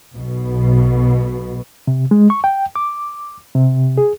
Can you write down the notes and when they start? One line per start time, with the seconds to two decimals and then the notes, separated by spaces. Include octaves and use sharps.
0.17 B1 B2
1.88 C3
2.11 G#3
2.30 C#6
2.44 G5
2.76 D6
3.55 C3
3.98 G#4